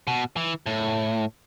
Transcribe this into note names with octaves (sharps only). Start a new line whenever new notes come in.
B2
E3
A2